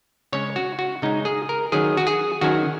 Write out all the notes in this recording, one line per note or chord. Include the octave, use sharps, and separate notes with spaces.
C#3 G#3 C#4 C#5
F#4
F#4
C#3 G#3 C#4 D#4
G#4
A#4
D#3 F#3 C#4 G#4
F#4
G#4
D#3 F#3 C#4 F#4